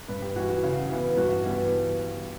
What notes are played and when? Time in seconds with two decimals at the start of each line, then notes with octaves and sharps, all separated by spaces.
0.08 G2 B4
0.22 G4
0.36 E3 G3 F#4
0.50 F#4
0.63 C#3
0.90 E3 B3
1.17 G2 F#4
1.44 E3 G3 B3